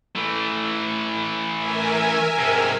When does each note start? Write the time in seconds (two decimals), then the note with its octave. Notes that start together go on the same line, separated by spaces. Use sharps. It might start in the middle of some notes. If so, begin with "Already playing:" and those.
0.15 E3 A3
1.55 A#4 E5 G#5
2.38 G#2 C3